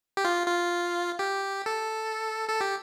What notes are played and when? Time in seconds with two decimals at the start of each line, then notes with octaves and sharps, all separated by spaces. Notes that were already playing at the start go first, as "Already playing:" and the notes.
0.17 G4
0.25 F4
0.47 F4
1.19 G4
1.66 A4
2.49 A4
2.61 G4